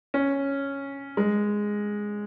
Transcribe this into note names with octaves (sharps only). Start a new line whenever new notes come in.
C#4
G#3